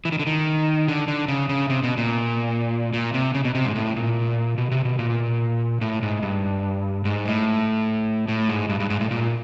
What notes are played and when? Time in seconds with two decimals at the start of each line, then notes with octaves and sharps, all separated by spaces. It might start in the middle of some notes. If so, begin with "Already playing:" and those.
0.05 E3
0.12 D#3
0.19 D3
0.27 D#3
0.88 D3
1.08 D3
1.28 C#3
1.49 C#3
1.70 C3
1.83 B2
1.97 A#2
2.93 A#2
3.14 C3
3.34 C#3
3.45 B2
3.55 C3
3.65 G#2
3.75 A2
3.96 A#2
4.58 B2
4.71 C3
4.85 B2
4.99 A#2
5.81 A2
6.03 G#2
6.22 G2
7.05 G#2
7.25 A2
8.28 A2
8.49 G#2
8.69 G2
8.80 G2
8.90 G#2
9.01 A2
9.11 A#2